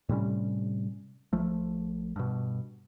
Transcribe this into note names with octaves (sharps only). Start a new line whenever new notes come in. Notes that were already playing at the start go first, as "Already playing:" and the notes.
A2 C3 G3 C#4
A#1 F3 A3
G2 B2